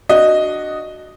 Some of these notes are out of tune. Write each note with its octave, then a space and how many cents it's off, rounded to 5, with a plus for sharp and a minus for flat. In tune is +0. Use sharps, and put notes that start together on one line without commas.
D4 +0 F#4 +0 D#5 +0